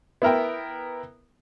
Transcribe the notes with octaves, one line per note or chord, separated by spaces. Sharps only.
B3 E4 A#4 G5